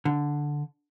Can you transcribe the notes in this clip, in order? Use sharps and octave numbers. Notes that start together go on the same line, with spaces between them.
D3